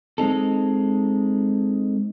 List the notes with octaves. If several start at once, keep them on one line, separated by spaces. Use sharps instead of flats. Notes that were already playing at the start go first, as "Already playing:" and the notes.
G#3 C4 D#4 A4